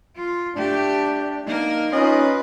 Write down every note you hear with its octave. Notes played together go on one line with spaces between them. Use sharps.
F4
A3 D4 G4
A#3 D#4 A#4
C#4 D#4 F4 B4 D#5